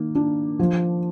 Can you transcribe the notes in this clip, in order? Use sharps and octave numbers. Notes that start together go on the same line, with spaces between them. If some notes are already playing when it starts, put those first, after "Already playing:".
Already playing: D#3 A#3
D4
F3